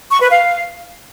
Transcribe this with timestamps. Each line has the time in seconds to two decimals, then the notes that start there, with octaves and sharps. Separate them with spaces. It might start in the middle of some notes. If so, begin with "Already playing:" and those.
0.10 C#6
0.20 B4
0.30 F5